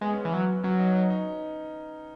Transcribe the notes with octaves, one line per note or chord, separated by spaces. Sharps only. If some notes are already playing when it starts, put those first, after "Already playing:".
G#3 B3
C#4
E3 B3
F#3
F#3 C#4
D#4
D#4
D#4